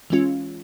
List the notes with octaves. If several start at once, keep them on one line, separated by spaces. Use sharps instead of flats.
E3 G#3 C#4 F4